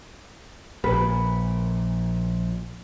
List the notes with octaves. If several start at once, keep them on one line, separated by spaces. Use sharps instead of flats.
A#1 A#2 B4